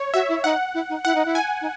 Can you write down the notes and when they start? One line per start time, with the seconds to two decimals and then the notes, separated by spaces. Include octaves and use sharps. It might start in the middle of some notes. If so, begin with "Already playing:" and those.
Already playing: C#5
0.14 F#4 E5
0.29 E4
0.44 D#4 F#5
0.74 E4
0.89 D#4
1.05 E4 F#5
1.15 D#4
1.25 E4
1.35 G#5
1.61 D#4